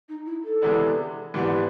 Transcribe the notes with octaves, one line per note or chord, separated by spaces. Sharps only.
D#4
E4
A4
C3 E3 G#3 B3 D4
G#2 E3 G3 B3 D4